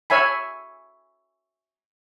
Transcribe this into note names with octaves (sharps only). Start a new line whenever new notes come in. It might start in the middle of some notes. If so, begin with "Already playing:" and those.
C#5 E5 G#5 B5